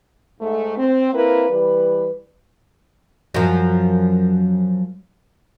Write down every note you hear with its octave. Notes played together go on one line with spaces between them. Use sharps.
G#2 A3
C4
A#3 C4 E4 A#4 B4
E3 G3 B4
F#2 F3